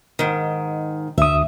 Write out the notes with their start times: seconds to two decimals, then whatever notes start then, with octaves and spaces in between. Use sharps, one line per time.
0.19 G#2 D#3
1.18 D2 E5 D#6